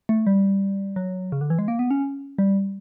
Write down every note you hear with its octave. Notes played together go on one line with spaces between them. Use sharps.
A3
G3
F#3
C#3
D3
E3
G#3
A#3
B3
C#4
G3